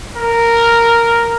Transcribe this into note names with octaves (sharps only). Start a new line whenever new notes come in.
A#4